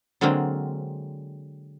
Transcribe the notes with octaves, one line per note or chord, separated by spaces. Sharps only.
D3 F#3 G#3 A#3 C4